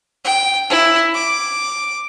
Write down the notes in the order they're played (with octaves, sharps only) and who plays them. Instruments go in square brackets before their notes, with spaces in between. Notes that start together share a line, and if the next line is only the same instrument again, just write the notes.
[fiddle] G5
E4
D6